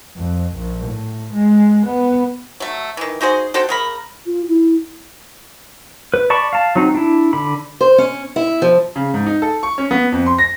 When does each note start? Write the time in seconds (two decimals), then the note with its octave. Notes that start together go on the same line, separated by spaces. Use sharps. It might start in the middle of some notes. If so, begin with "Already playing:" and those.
0.16 F2
0.57 A#1
0.87 A2
1.35 G#3
1.87 B3
2.60 F#3 A3
2.97 D#3 E3
3.21 D#4 F#4 G#4 C5
3.54 F#4 A4 C5 G5
3.69 C#3 A#4 B5
4.26 F4
4.48 E4
6.14 B4
6.30 D5 A5 B5 C#6
6.53 F5 A5
6.76 F#3 C4 D#4
6.95 D4 E4
7.33 D3 B5
7.81 C5
7.98 C#4
8.36 E4
8.62 F3
8.96 C#3
9.14 G#2
9.26 D#4
9.42 A4
9.63 C#6
9.78 C#4
9.91 B3
10.12 F2
10.26 C6
10.38 A#6